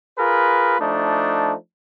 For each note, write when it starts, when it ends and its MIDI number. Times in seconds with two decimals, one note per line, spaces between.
0.18 0.79 65
0.18 0.79 68
0.18 0.79 70
0.18 0.79 71
0.79 1.54 53
0.79 1.54 57
0.79 1.54 62
0.79 1.54 63